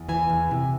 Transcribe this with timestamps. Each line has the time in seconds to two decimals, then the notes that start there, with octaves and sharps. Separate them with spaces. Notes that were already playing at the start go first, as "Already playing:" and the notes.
Already playing: E2
0.09 E3 G#5
0.30 E2
0.51 C3